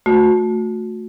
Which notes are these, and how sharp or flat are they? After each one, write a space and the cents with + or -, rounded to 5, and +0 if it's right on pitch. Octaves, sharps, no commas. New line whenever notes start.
A3 +0 F#4 -30